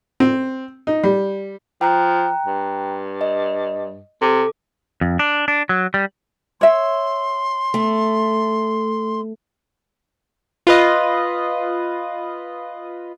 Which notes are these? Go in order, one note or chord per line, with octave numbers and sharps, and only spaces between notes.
C4
D#4
G3
F3 G5 A#5 F#6
G2
D#5
C3 A4 D6
F2
D4
D4
F#3
G3
C#5 E5 C6
A3
F4 B4 D#5